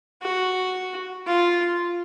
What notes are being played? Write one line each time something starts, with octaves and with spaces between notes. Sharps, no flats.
F#4
F4